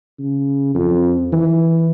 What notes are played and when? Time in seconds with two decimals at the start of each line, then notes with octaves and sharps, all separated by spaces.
0.19 C#3
0.75 F2
1.33 E3